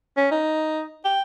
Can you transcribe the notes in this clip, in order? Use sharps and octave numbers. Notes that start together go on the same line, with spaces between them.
C#4
D#4
G5